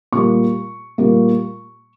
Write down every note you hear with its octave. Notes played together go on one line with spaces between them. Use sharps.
A#2 G3 A#3 C#6
A#2 G3 A#3